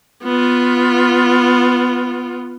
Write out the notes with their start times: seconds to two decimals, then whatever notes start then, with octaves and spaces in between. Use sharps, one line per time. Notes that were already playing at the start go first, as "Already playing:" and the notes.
0.23 B3 F4